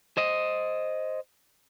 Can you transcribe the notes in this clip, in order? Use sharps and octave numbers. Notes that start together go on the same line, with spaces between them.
C5 D#5